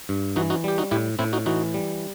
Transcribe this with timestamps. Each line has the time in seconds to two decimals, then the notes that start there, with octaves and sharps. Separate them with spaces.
0.09 G2
0.36 E3 D#4 F#4
0.50 D#4 F#4
0.64 G3 G4
0.78 D#4 F#4
0.91 A2 E4 G4
1.19 A2 C4 E4
1.33 D#4 F#4
1.46 E3 D#4 F#4
1.74 G3